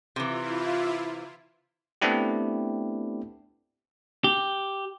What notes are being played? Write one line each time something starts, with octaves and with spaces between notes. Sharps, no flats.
C3 E3 E4 F4
A3 B3 C4 D4 E4 G4
G4